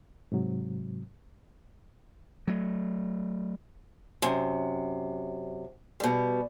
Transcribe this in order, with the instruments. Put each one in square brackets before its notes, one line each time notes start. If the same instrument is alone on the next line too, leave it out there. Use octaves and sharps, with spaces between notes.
[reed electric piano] G#2 C3 F#3
[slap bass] F#3 A3
[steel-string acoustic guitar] F#2 C3
B2 G3